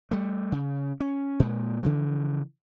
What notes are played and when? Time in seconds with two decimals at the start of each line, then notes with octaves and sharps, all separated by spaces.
0.11 G3 A3
0.52 C#3
1.00 C#4
1.40 A#2 G#3
1.83 C#3 E3 F3